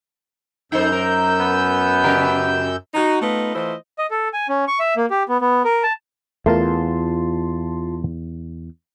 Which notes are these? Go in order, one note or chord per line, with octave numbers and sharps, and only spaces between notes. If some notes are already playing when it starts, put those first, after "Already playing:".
F#2 D#4 A4 C5 E6 G6
A#4
B3
C#3 G4 A#4
D#4 F#4
A3 B3 D#4 F4 B4 D#5
E3 A3 E4 F4 C5 D#5
D#5
A4
G#5
C#4
C#6
E5
A#3
G4
B3
B3
A#4
A5
E2 A3 F4 A#4 A5 C6